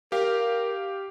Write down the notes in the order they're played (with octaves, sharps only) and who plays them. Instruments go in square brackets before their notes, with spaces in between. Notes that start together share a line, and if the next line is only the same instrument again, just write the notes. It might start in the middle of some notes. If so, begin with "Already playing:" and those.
[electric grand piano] G4 F5 [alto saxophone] A#4